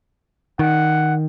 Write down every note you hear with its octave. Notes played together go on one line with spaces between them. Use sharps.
D#3 F#5